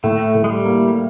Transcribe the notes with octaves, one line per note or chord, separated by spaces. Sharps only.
A2 A3
A2
G#3
G3
A#3